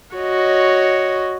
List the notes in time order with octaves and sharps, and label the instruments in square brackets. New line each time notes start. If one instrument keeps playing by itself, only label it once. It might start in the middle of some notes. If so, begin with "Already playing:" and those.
[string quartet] F#4 C#5 D#5